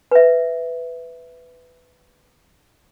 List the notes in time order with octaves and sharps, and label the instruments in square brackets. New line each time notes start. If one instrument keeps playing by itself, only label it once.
[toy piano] B4 E5